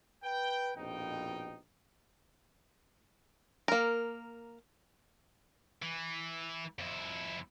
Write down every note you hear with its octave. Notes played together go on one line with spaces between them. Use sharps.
B4 G5
A#1 F2 B2 D#4 G5
A#3 A#4
E3
F2 E4